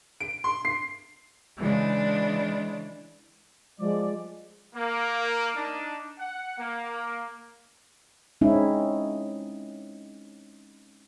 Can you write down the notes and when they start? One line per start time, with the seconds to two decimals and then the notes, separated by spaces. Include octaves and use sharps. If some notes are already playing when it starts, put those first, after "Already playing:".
0.20 D7
0.44 C6
0.65 C7
1.59 C#3 E3 G#3 D4
3.80 F3 G#3 D5
4.75 A#3
5.55 D4 D#4
6.19 F#5
6.58 A#3
8.41 G#3 C4 C#4 D#4 E4